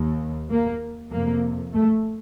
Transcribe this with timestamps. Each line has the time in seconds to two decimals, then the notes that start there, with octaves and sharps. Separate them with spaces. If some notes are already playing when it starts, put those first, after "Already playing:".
Already playing: D#2
0.50 A#3
1.11 F2 C3 A#3
1.73 A3